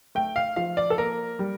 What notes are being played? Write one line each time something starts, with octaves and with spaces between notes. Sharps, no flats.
A3 G5
F5
F3 F5
D5
A4
A#3 A#4
G3